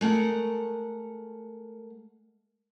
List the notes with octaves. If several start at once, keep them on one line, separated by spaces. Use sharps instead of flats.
G#3 A3 A#4 F#5